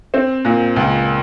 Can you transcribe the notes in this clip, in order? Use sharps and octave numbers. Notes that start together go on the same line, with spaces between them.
C4
A#2
C#2